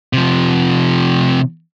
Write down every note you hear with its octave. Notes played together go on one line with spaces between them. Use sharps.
C3 F3